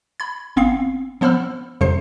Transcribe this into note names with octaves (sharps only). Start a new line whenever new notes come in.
B5 G#6
G1 B3 C4 F5 C7
F3 B3 C5 B5 E6 F6
F2 C3 F#3 C5 C6 C7